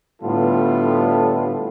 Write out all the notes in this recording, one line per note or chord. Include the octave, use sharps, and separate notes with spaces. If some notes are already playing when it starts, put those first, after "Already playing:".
A2 D3 G3 B3 F4 A4